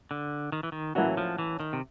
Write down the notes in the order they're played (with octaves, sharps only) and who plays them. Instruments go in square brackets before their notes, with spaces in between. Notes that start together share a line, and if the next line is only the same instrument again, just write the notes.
[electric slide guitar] D3
D#3
E3
D#3
[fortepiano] A2 F#3 A#3 C#4 F#4 [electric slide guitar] E3
[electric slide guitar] F3
E3
D#3
C3